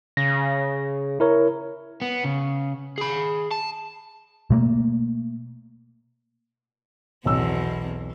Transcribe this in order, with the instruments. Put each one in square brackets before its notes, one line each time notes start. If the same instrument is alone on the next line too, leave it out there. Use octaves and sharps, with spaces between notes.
[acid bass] C#3 [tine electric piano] A#6
[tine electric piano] E4 A#4 C#5
[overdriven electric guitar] B3
C#3
G#4 B5
A5
[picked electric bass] B2 A3 A#3
[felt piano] B1 E6 [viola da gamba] E2 B2 C4